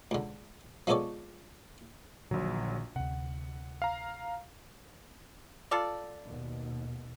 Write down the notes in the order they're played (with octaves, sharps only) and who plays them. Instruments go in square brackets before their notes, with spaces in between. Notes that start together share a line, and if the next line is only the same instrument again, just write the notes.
[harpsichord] C#2 D3
F3 G#3 B3 A4 C#5 D5
[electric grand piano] A#1 F#3 [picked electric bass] A#2 D3 D#3
[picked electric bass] D2 C3 [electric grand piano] F#5
[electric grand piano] F5 A#5
[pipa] F4 A4 D5
[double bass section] D#2 B2